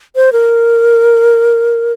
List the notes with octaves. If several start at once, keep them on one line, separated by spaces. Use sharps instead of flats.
C5
A#4